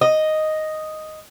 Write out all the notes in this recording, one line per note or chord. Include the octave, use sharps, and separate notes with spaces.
D#5